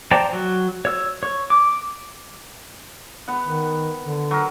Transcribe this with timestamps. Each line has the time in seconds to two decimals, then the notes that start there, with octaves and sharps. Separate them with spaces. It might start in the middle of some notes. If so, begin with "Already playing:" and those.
0.11 C5 D5 G5 A5 A#5
0.33 F#3
0.85 C#5 E6
1.23 C#5
1.50 D6
3.28 B3 F#5
3.47 D#3
4.00 D3
4.31 F#3 A#4